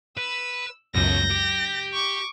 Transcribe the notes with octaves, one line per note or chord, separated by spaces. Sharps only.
B4 E6
C#2 F#2 B2 F#3 G6 A#6
G4
C#6 D6